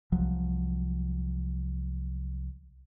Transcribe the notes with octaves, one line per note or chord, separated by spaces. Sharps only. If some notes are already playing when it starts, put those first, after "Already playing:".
C2 F3 F#3